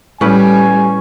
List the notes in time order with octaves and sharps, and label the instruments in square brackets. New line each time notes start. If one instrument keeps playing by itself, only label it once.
[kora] A2 B4 [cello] G3 [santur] C#4 [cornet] G#5